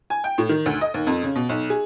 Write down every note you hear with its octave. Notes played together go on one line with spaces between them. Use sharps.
G#5
G5
A2
D#3
D2
D#5
D#2
F2
C#3
B2
B1
G#4